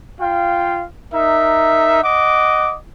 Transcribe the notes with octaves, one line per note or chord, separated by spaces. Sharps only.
F4 F5 G5
D#4 A#4 E5
D#5 F#5 D6